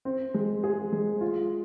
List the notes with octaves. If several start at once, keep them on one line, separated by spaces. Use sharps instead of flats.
C4
G#3
G#4
G#3
F4